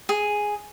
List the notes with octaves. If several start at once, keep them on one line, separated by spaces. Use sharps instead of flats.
G#4